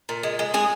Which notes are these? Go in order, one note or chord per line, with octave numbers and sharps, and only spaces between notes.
A#2
G#3
G#3
G#3 G#4